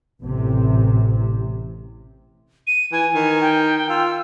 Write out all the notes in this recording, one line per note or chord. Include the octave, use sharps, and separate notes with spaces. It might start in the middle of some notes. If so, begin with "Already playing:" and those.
A1 C3
D#7
E3 G#5
D#3
G5
F4 E6